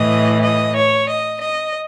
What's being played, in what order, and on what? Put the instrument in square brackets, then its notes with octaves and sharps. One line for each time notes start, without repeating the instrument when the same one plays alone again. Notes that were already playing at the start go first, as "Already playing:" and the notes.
Already playing: [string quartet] A2 E3 D#5
D#5
C#5
D#5
D#5